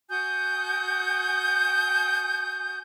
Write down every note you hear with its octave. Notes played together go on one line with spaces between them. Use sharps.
F#4 G#5 D#6 G6